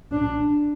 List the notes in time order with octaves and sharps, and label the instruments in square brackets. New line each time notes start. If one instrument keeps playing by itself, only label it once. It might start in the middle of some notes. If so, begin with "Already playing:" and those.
[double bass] D4